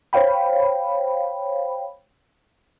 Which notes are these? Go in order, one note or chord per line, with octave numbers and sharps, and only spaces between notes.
C5 C#5 F5 G5 B5